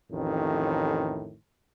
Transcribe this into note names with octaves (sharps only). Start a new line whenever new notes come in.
A1 F2 A2 D#3